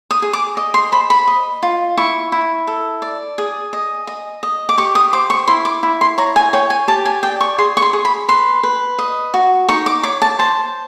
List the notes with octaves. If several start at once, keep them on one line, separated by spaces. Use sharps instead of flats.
D#6
G#4
D6
D#5
C6
C5 B5
B5
D#5
F4
E4 C#6
E4
A4
D5
G#4
D#5
D#5
D#5
D6
G4 C#6
D#6
C5 D6
C#6
E4 C6
D6
E4
C6
C#5 A#5
G#5
C#5 G5
G#5
G4 A5
G#5
D5 G5
C#6
G#4 C6
C#6
C6
G#4
B5
B4 C6
B4
D#5
F#4
D#4 C#6
D6
C#5 D6
A5
C5 A5